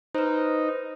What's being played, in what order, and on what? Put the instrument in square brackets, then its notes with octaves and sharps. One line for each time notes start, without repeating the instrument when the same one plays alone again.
[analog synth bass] D#4 [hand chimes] B4 C5